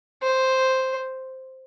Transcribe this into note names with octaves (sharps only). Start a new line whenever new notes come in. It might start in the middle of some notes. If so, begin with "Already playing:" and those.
C5